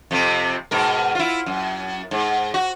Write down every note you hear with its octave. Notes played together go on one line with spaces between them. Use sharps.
F2 C3 C4
G#2 B2 A#4
E4 F4
F#2
G#2
F#4